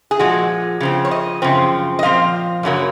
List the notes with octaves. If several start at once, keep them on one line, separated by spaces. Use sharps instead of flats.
G#4
A#2 F3 G#3 F#4
C#3 F3 C4
C#5
D#5
F#2 C#3 F3 C4
D#5
A#2 F3 C4 F5
F#2 C#3 F#3 A#3